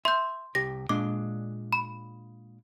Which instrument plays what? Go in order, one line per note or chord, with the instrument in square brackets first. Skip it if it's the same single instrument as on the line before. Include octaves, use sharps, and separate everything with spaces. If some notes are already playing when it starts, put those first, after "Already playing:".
[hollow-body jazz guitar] E5 [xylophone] C6 G6
[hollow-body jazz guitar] C2 G4 [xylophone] A#6
[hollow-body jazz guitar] A#2 G#3 D4 [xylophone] D6
[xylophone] B5